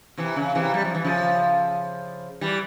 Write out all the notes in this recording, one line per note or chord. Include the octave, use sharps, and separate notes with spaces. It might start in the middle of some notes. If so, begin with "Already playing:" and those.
C3 E3
C#3
C3 E3
G3
F3
E3
C#3 F3
E3 G3